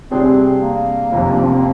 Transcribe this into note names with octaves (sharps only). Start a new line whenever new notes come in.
C3 G3 C4 D4 G#4
A#3
F1 F2 C3 F3
D4
C4
A#3